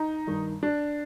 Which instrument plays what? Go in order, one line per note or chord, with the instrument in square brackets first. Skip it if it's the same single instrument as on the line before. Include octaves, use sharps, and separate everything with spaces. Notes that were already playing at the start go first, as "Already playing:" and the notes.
Already playing: [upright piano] D#4
G2 D#3
D4